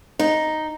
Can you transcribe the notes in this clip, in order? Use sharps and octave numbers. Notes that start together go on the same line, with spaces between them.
D#4